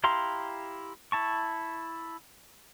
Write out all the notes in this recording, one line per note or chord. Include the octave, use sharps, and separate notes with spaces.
E4 G4 F5 A#5 C6
E4 A5 C#6